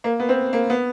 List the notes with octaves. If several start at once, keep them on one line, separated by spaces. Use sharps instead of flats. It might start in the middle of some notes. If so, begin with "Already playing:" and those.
A#3
B3
C4
A#3
B3